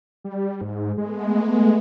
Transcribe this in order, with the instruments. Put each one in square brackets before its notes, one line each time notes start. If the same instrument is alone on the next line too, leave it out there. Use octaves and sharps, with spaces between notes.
[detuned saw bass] G3
G#2
[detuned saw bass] G#3 [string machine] A3 B3